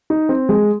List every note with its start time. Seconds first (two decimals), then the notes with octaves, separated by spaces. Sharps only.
0.10 D#4
0.29 C4
0.49 G#3